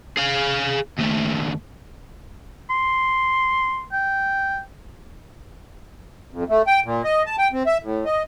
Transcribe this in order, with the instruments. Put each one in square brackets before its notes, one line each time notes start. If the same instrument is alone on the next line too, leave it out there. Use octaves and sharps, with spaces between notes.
[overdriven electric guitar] G#4 F5
D#2 A3
[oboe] C6
G5
[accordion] F2
A3
G5
A#2
D#5
A5
G5
C4
E5
A2
D#5